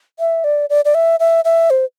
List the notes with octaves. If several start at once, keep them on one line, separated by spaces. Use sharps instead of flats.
E5
D5
D5
D5
E5
E5
E5
C5